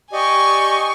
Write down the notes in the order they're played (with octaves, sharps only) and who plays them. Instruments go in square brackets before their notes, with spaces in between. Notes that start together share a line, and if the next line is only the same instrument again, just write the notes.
[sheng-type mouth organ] G4 D5 D#5 [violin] G#5 C#6